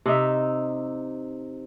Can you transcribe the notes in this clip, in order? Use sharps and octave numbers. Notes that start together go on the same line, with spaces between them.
C3 D#4 E5